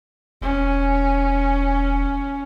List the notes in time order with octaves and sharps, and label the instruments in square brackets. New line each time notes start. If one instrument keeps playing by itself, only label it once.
[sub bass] E1 [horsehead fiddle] C#4